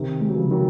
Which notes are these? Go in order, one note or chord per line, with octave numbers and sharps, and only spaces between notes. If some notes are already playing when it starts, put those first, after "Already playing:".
Already playing: C3 D#3
G#3
F#3
C#3 F3
D#3 F#3